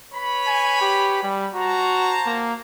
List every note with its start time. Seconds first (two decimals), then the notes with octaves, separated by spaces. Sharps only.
0.13 B4 C#5 B5
0.47 G#5
0.81 G4
1.23 G3
1.54 F#4 C5 A5 A#5
2.26 A#3